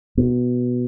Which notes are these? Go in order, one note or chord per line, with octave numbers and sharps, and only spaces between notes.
B2